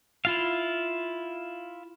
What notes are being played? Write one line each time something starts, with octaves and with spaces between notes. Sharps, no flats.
E4 F4 F5